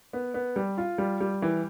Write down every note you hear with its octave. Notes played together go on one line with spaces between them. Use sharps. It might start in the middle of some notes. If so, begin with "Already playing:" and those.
B3
B3
G3
F4
G3
G3
E3